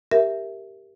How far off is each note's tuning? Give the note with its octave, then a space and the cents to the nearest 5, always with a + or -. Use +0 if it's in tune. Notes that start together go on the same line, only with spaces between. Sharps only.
G4 +0 A#4 -5 E5 +0